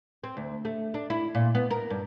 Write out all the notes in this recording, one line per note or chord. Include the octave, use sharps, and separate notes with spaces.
C4
D2
A3
D4
E4
A#2
B3
A#4
G2